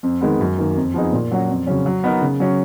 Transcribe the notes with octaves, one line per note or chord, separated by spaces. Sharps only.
F2
D#3 G#3 B3
F#2
D#3 A#3
F2
F3 B3 D#4 G#4
A#2
F#3 C#4 F#4
F2
C#3 F#3 C#4
F#3
B3 D#4 A#4
C#3
F#3 C#4